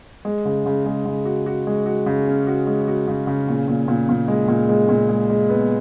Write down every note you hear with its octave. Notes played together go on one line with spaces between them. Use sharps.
G#3
C#3
C#3
G#3
C#3
F#4
F#4
G#3
F#4
C#3
C#4
F#4
G#3
F#4
C#3
C#3
A#2
A#2
A#2
A#2
G#3
A#2
G#3
A#2
G#3
G#3
B3